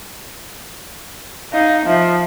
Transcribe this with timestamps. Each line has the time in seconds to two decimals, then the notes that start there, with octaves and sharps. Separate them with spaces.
1.52 D#4 F5
1.86 F3 E5